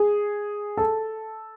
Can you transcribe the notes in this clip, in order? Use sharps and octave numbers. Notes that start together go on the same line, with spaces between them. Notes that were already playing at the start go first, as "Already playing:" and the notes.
Already playing: G#4
A4